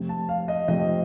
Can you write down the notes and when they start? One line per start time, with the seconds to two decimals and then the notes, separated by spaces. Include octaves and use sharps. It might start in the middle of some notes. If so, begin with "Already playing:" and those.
Already playing: F2 C3 F3 A3 C4
0.09 A5
0.29 F5
0.48 D#5
0.68 F2 C3 F3 A3 C4 D#5